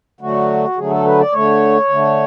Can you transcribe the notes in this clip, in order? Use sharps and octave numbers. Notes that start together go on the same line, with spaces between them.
D3 F#3 A3 F#4
D3 F#3 A3 G#4
A4
B4
D5
D3 A3 C#5
D3 A3